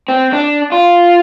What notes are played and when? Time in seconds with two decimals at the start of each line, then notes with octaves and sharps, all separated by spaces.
0.08 C4
0.33 D4
0.72 F4